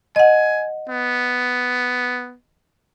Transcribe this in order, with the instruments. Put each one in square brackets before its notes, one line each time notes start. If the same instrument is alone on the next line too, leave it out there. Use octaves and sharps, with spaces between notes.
[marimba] D#5 F#5 [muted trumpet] G#5
[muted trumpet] B3